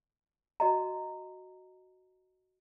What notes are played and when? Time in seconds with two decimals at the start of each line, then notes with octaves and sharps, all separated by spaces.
0.60 F#4 D#5 A#5